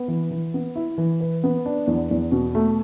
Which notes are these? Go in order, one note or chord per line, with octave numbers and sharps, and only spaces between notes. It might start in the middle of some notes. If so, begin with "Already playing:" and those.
Already playing: B3
E3
E3
B3
E4
E3
B4
B3
D4
E2
E2
B2
A3